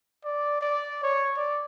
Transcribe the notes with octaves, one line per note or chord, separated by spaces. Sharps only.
D5
D5
C#5
D5